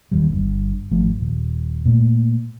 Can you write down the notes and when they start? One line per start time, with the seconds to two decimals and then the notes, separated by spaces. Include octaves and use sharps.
0.12 D#1 D#2 A#2 G3
0.32 G1 G2
0.91 G#1 F3 A3
1.20 D#1
1.85 A#2 A3